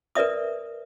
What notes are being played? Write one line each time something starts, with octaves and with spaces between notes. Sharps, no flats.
A#4 B4 D5 E5 D#6